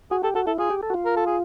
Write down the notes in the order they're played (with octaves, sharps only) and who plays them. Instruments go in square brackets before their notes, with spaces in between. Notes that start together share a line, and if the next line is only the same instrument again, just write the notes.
[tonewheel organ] F#4 [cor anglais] G#4
[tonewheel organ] G4 [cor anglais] A4
[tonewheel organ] F#4 [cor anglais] A4
[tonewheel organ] E4 [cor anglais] A4
[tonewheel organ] F4 [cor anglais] G#4
[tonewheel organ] G4
A4
F#4
F4
[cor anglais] A#4
A4
G#4